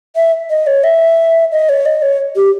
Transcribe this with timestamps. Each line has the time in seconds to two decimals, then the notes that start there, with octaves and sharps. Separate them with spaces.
0.16 E5
0.50 D#5
0.67 C#5
0.84 E5
1.52 D#5
1.69 C#5
1.86 D#5
2.02 C#5
2.36 G4